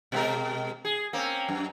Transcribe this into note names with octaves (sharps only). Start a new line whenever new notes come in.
B2 G#3 A#4
G#4
A#3 C4 C#4
F#2